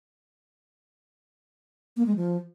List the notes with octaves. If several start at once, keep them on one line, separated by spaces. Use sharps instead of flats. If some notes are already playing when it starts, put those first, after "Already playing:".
A#3
G#3
F3